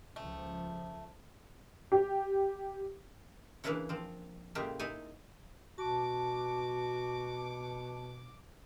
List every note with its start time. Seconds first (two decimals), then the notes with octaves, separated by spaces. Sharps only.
0.16 C#2 C#3 F3 A3
1.92 G4
3.64 C#3 E3 A#3 D4 E4 C#5
3.89 F3 C4
4.55 A2 C#3 G#3 A#3 G4 E5
4.79 D#4 E4 G#5
5.78 B2 F#4 A5 D6